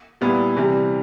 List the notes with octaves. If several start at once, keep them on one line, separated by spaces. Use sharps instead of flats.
A#2 G3 B3 E4
C3 E3 G3